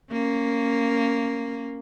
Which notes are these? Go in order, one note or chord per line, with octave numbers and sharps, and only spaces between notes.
A#3 C#4